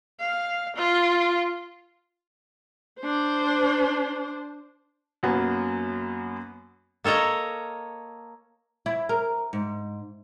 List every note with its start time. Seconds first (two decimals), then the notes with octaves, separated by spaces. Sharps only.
0.20 F5
0.77 F4
3.00 D4 C5
5.23 F#2 F#3 A#3 B3
7.04 A#3 A4 C#5 D#5 A#5
8.86 E4
9.09 A#4
9.53 G#2